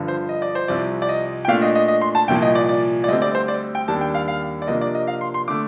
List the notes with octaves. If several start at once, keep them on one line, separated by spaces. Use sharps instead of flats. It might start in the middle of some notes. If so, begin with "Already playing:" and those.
Already playing: G2 D3 F3
C5
D#5
D5
C5
C2 C3 F3 C4 D5
D5
D#5
G5
A#2 A3 D4 F5
D#5
D#5
D#5
C6
A5
C2 A#2 F3 G5
D#5
D5
D5
D5
D2 D3 G3 C4 D#5
D5
C5
D5
G5
D#2 D#3 G3 D4 A5
G5
F5
F5
D5
C3 F3 A#3 D4 D#5
D5
D#5
F5
C6
C6
D3 A3 D6